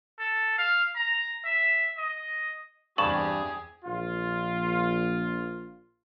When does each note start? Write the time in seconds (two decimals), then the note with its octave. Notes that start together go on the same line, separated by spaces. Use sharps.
0.19 A4
0.58 F5
0.96 A#5
1.45 E5
1.98 D#5
2.98 E2 G2 C4 G4 G#4 A5 C#6
3.85 A#1 F4